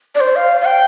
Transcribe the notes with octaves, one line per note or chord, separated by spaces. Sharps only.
D5
C5
F5
F5
G5